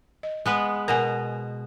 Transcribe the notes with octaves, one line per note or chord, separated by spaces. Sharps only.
D#5
G#3 B3 B4
B2 A#4 F#5 G#5 A#5